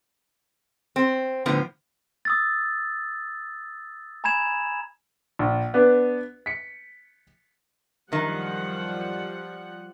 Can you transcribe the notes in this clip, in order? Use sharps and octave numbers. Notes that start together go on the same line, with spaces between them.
C4
A2 D3 F3 B3
D#6 E6 A6
G#5 A#5 B5 G#6 E7 F7
A#1
B3 D4 B4
B6 C#7
F#2 D#3 F3 G3 F#5